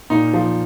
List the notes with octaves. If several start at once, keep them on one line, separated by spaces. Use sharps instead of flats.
A#2 D#4
F3